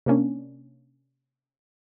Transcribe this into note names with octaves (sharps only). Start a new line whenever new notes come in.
C3 A#3 C#4 D4